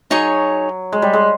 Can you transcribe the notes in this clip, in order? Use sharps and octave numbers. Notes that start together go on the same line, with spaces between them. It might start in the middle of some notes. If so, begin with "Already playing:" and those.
F#3 D#4 G#4 C#5
G#3
G3
G#3